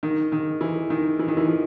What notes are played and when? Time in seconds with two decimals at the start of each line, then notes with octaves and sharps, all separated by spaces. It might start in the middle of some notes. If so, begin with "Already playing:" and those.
0.03 D#3
0.32 D#3
0.61 E3
0.90 D#3
1.19 E3
1.28 D#3
1.37 E3
1.47 F3